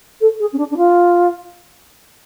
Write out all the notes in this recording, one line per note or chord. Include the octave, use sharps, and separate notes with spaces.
A4
G#4
C#4
D4
D4
F4